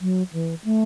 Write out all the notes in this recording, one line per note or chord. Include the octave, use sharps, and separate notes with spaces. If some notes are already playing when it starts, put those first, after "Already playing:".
F#3
E3
A3